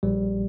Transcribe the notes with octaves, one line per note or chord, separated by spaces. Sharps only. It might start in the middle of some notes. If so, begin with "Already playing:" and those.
A#1 G3